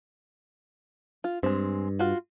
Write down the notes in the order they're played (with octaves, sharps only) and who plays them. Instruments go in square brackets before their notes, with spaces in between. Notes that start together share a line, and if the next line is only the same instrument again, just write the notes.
[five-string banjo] F4
[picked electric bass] G2 [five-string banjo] G#3 C4
[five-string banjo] F4 F#4